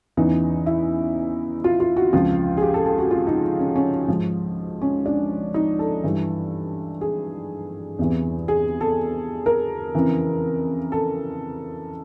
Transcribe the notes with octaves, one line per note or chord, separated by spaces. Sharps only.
E2 C#3 E3 D#4
E4
F4
F4
F#4
C#2 C3 F3 F4
G#4
G4
A4
A4
F#4
F4
D#4
C#4
C#4
G#2 F3
C#4
D4
D#4
A4
G2 E3
G#4
E2 C3 E3
G#4
A4
A#4
F2 C#3 E3
A4